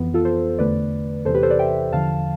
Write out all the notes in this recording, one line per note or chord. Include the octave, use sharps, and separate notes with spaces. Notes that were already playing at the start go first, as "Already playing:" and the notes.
Already playing: F2 E3 B3
F4 A4
A4 C5
E2 D3 A3 B4 D5
E2 C3 E3 A4 C5
G4 B4
A4 C5
B4 D5
E5 G5
E2 D3 F3 F5 A5